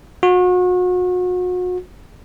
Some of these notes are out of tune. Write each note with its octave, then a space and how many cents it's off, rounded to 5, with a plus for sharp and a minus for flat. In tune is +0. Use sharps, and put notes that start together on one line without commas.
F#4 -35